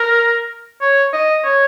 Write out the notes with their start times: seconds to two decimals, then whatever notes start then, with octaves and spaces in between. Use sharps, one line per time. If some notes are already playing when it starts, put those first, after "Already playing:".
Already playing: A#4
0.81 C#5
1.13 D#5
1.44 C#5